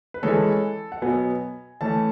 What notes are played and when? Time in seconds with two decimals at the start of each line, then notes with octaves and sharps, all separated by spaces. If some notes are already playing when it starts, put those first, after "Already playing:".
0.14 B4
0.23 E3 G#3 C#4 A4
0.92 F#5
1.02 B2 F#3 B3 G#5
1.81 E3 A3 C#4 A5